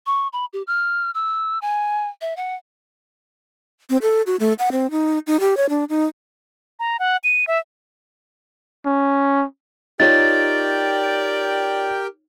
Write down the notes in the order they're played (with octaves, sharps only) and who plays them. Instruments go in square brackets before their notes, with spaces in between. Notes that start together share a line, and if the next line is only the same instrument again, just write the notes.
[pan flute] C#6
B5
G4
F6
E6
G#5
E5
F#5
[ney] C4
A4
F#4
A3
F#5
C4
D#4
D#4
G4
C#5
D4
D#4
[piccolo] A#5
F#5
D#7
E5
[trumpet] C#4
[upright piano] D#4 F4 C#5 [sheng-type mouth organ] G4 A#4 G5 [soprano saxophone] D5 [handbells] A6